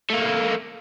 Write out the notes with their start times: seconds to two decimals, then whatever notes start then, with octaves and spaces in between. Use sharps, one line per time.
0.10 A3 A#3